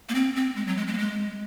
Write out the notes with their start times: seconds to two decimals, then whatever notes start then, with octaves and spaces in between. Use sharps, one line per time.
0.09 A#3
0.15 C4
0.36 C4
0.56 G#3
0.67 F#3
0.77 G#3
0.87 G#3
0.93 A#3
0.98 G#3